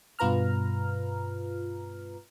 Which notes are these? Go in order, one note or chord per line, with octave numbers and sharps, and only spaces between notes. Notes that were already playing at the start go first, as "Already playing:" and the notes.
G2 B2 F4 B4 A#5 F6